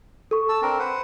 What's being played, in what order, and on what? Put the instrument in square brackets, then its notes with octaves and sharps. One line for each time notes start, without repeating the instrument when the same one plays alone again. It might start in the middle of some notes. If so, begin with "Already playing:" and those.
[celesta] A4 C#6
[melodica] A5 E6
C4 D4 A#4
B4 C5 F#5